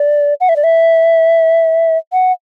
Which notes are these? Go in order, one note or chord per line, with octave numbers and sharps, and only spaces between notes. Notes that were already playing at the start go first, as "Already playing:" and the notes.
Already playing: D5
F#5
E5
D5
E5
F#5